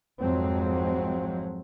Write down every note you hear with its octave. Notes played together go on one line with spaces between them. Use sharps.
G#1 F2 F3 F#3 G#3 C4